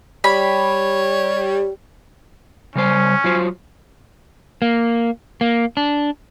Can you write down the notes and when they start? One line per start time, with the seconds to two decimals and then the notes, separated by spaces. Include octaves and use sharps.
0.24 G3 C#5 B5
2.75 C#3 G3 C#4 C5
3.24 F#3 F4 C5
4.62 A#3
5.41 A#3
5.77 D4